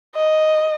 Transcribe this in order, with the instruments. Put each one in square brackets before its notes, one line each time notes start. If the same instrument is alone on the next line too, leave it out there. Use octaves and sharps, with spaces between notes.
[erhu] D#5